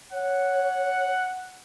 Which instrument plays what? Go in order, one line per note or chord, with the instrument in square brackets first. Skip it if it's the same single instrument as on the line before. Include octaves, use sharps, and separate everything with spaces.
[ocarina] C#5 [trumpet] F#5